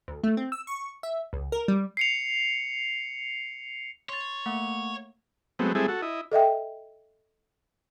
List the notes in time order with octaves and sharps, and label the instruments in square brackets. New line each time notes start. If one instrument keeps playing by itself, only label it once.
[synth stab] D2
A3
C4
E6
C#6
E5
C#2
A#4
G3
[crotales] C7 C#7 F7
[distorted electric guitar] C#5 [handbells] C6 A6
[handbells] A3 A#3 F#5
[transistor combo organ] F#3 G#3 A3 B3 C4
G3 G#3 C4 E4 G#4 A4
F#4 A4
E4 D#5
[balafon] A4 D#5 E5 G5